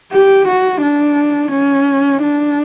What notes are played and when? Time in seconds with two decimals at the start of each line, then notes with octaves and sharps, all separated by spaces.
0.12 G4
0.48 F#4
0.82 D4
1.51 C#4
2.22 D4